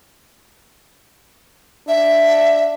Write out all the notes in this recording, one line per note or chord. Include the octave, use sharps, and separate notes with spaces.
D4 E5